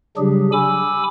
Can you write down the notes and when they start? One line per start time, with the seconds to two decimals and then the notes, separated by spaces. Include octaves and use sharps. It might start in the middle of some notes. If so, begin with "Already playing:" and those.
0.17 C#3 F#3 G3 D4 G4 G#4
0.53 G#5 B5 D6 E6